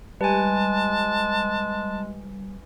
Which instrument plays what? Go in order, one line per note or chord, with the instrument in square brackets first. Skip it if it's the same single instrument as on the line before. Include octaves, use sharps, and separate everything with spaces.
[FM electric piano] G3 [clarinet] G#3 [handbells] B4 G#5 [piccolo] A5